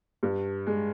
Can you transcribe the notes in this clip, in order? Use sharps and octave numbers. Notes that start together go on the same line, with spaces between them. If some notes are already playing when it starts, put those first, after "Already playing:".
G2
G#3